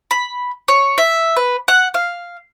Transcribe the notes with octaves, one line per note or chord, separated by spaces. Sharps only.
B5
C#5
E5
B4
F#5
F5